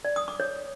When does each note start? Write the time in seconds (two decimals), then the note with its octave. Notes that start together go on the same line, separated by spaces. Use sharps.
0.05 D5
0.16 D#6
0.28 D6
0.40 C#5